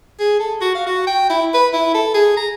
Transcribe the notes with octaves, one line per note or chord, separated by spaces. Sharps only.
G#4
A4
F#4
F5
F#4
G5
E4
B4
E4
A4
G#4
A#5